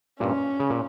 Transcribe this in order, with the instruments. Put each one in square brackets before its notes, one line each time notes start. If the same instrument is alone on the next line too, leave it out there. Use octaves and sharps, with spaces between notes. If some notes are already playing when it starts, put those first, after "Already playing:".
[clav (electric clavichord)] G2 A#2 [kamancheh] C#4
[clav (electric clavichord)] C#3
A#2